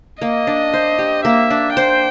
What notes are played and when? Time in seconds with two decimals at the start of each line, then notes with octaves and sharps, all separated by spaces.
0.21 A#3 D#5
0.47 D4
0.74 C5
0.99 G4
1.25 A#3 E5
1.51 D4
1.76 C5 G5